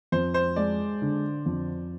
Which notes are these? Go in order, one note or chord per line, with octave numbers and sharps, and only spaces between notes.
F2 C5
C5
G#3 D5
D3
F2